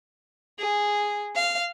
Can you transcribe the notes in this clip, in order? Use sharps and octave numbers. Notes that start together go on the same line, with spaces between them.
G#4
F5